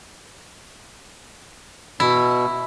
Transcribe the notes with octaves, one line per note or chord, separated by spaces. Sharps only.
B2 E4